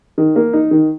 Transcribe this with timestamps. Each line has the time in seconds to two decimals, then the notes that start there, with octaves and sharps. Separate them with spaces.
0.18 D#3
0.36 A#3
0.53 D#4
0.71 D#3